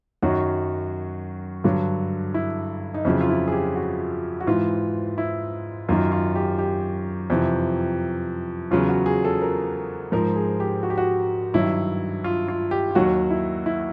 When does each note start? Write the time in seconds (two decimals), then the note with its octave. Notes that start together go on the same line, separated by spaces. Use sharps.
0.22 F#2 D#3 F#3 F#4
1.64 G2 D3 F#3
2.34 E4
2.94 D#4
3.05 F2 C#3 F#3 E4
3.21 F4
3.29 E4
3.48 G#4
3.52 G4
3.76 F#4
4.40 F#4
4.47 G#2 E3 F4
5.18 E4
5.89 F#2 D#3 F#3 F4
6.12 F4
6.36 G4
6.59 G4
7.30 F2 C3 E3
8.71 E2 C#3 F#3 F4
8.89 F#4
9.06 G#4
9.25 A4
9.42 A#4
10.12 G#2 F3 A#4
10.36 G#4
10.60 G4
10.83 F#4
10.90 G4
10.98 F#4
11.54 G2 D#3 F#3 E4
12.24 F4
12.48 F4
12.71 G4
12.91 F4
12.95 D#2 D#3 F#3 F#4
13.30 E4
13.66 E4